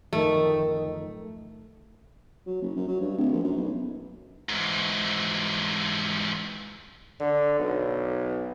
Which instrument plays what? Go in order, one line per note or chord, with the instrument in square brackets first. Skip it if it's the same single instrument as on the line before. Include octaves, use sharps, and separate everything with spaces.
[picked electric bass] D1 F#2 F3 [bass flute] D#3 [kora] A3
[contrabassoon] F#3
F#1
F#2
F#3
G2
D1
A#1
F#2
B1
[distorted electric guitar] G#2 E3
[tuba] D3
B1